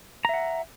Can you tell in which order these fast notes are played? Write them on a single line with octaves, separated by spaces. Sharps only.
A#5 E5 F#5